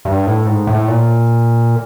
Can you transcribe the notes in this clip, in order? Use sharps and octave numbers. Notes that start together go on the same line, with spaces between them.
G2
A2
G#2
A2
A#2